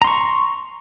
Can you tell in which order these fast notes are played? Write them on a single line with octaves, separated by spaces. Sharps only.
A#5 C6 C#6